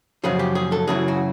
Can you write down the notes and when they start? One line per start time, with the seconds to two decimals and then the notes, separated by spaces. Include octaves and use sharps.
0.24 F#2 C#3 F3 G#4
0.39 G4
0.55 G#4
0.72 A4
0.87 F#2 C#3 E3 G#4
1.08 F#4